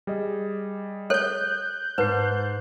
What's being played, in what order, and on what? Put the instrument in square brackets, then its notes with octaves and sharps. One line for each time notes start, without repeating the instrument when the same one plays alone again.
[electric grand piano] G3 G#4 D#5
[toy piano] A4 C#5 [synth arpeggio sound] F#6 G6
[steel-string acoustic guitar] G#2 [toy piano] B4 [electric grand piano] A5 C7